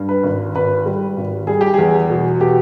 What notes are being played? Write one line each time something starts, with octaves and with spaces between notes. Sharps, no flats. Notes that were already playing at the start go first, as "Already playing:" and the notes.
Already playing: G2
B4
G#1
G#1 B4
G3
G#1
G3 G#4
G4
E2 G#4
B2
B2 G4